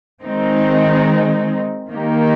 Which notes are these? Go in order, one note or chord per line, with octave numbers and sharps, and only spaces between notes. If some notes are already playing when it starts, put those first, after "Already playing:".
D#3 G#3 C4 D#4
D#3 A#3 D#4 G4